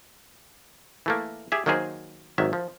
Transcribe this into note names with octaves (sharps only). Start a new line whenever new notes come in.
E3 A3 A#3
G4 G#4 E5
D#3 F#3 A#3 D#4 G#4 C5
G#1 D#3 F#3 E5
F3